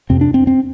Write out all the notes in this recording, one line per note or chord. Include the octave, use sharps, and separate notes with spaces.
F2 C3 C4
D4
C4
C4